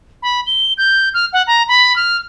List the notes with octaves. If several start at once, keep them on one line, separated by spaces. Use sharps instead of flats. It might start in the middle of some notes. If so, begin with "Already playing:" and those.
B5
G7
G6
F6
F#5
A#5
B5
F6